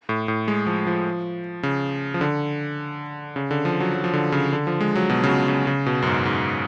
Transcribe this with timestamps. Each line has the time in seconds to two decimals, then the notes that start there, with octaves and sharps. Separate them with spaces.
0.09 A2
0.28 A2
0.48 G#3
0.67 F3
0.87 F3
1.63 C#3
2.14 F3
2.21 D3
3.36 C#3
3.51 D3
3.65 F3
3.80 F#3
3.94 F#3
4.04 F3
4.13 D3
4.32 C#3
4.53 D3
4.67 F3
4.81 G#3
4.95 F#3
5.10 B2
5.24 C#3
5.29 B2
5.48 C#3
5.67 C#3
5.86 B2
6.02 F#2
6.06 G#2
6.25 G#2